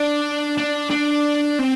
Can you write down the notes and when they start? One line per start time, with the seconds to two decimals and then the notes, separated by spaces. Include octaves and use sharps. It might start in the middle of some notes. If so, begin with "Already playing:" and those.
Already playing: D4
0.57 D4
0.91 D4
1.59 C4